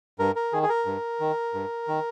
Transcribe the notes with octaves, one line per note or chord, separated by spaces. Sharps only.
G2 A#4
A#4
D#3 G#4
G#4
A#4
G2
D#3
G2
D#3